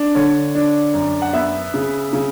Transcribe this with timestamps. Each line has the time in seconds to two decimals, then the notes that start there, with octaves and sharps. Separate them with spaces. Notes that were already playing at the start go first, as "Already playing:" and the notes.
Already playing: D4
0.15 D3 C#5
0.55 D4
0.94 F#2
1.22 F#5
1.33 B3 E5
1.74 C#3
2.13 C#3